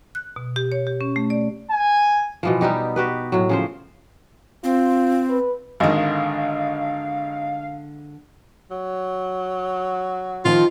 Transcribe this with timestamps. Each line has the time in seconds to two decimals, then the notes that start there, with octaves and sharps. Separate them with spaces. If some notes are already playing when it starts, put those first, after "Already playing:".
0.15 F#6
0.36 B2
0.56 G4
0.72 C#5
0.87 G4
1.01 C#4
1.16 A3
1.30 D5
1.71 G#5
2.43 B2 E3 F3
2.61 G3 B3 D#4 G4
2.96 F#4 G4 B4
3.32 A2 F#3
3.49 C#3 F3 C5
4.64 C4 F4
5.29 B4
5.80 G#1 D3 D#3 G#3 F5
8.71 F#3
10.45 D#3 F3 F4